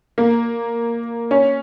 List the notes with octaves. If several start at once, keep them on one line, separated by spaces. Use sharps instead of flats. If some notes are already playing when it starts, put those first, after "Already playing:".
A#3
C#4